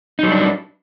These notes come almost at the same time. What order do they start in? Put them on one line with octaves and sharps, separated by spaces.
D#4 F#3 G3 D4